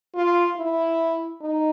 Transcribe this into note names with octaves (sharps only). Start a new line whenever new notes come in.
F4
E4
D#4